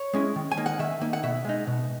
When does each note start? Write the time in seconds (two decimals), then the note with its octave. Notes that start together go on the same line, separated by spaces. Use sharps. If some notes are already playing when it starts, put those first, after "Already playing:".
Already playing: C#5
0.13 G#3 C#4 E4
0.36 D#3
0.52 G#5
0.57 A#3 D#4
0.66 F#5
0.79 D#3 E5
1.01 A#3 D#4
1.13 F#5
1.23 B2 E5
1.45 G#3 D#4
1.67 B2